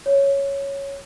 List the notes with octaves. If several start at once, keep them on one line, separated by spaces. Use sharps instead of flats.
C#5